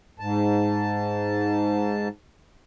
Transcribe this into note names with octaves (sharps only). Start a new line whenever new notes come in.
G#2 A5